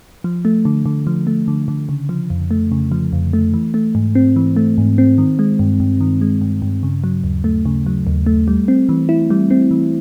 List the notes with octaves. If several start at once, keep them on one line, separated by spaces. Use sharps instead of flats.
F3
A3
D3
D3
F3
A3
D3
D3
C#3
F3
F2
A3
C#3
F3
F2
A3
E3
A3
G#2
C4
E3
A3
G#2
C4
D#3
G#3
G2
G2
D#3
G#3
G2
G2
C#3
F#3
D#2
A3
C#3
F#3
D#2
A3
G3
C4
E3
E4
G3
C4
E3